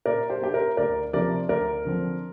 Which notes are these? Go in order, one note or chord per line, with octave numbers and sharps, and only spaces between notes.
A#2 A#4 D5
G4 C5
A#3 D4 G4
A#4
D2 A#4 D5
C3 F3 A#3 D4 A#4 D5
D2 A#4 D5
D3 F3 C4